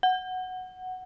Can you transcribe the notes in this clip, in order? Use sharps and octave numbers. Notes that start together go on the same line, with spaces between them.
F#5